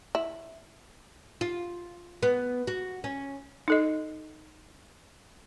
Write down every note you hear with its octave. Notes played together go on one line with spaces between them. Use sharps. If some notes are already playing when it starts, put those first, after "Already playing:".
E4
F4
B3
F#4
C#4
D#4 A4 D#5